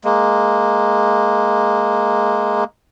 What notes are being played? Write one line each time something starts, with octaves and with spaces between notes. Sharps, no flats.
G#3 A#3